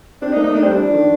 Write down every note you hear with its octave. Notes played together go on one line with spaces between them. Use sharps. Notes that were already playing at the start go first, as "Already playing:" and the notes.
C4 D4
D#4
A#3
D#4
A3
D4
G3 C4
D4
F3
D#3